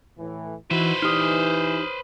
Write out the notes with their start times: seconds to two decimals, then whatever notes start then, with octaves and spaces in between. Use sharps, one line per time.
0.18 A2 E3
0.71 E3 D#4 E4 F#4 B4 C5
1.02 E3 D#4 G4 D5 D#6 F6